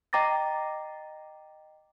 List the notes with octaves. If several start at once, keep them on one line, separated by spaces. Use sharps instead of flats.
D#5 G5 A#5 D6 A6 A#6